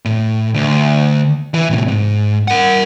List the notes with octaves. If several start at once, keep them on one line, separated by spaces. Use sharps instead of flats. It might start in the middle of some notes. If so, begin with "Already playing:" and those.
A2
D2
E3
A2 C3
G#2
A#4 F#5